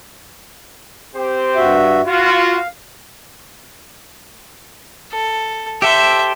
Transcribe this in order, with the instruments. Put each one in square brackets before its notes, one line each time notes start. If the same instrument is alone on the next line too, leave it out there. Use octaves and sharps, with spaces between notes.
[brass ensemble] C4 G4 C5
[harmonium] G2 F#4 E5
[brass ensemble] F4 F#4 [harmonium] F5
[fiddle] A4
[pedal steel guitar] G4 A4 C5 [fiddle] E5